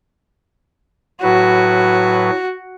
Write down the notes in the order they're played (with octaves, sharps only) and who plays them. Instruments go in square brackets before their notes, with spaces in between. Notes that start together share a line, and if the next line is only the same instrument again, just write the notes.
[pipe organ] A2 F#3 B4 [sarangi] F#4